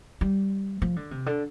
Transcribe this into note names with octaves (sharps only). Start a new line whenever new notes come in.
G3
F3
D3
C3
D3